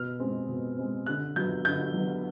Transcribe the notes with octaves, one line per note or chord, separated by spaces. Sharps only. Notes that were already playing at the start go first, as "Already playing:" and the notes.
Already playing: B2 F6
G#3 C4
B2
G#3 C4
D3 F#6
F#3 B3 G6
D3 G6
F#3 B3